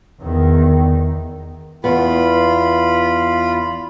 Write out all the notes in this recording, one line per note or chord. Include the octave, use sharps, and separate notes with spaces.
E2 D#3
E2 B3 F4 B5